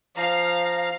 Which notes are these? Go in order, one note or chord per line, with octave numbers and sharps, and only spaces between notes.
F3 F5 A#5